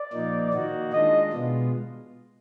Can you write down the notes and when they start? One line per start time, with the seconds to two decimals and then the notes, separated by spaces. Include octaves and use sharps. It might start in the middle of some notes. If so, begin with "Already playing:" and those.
Already playing: D5
0.13 A#2 F3 A#3 D#4
0.53 D#3 A#3 D#4 F#4
0.93 D#3 G#3 D4 F4 D#5
1.33 B2 G#3 B3 F4